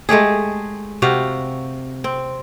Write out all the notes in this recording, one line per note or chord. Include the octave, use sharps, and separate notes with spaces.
G#3 A3 G4 G#4
C3 F#4 G4 F5
C4